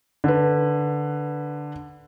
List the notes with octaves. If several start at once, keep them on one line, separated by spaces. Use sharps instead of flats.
D3 B4